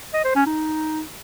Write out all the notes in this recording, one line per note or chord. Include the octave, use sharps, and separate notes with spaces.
D#5
C5
C#4
D#4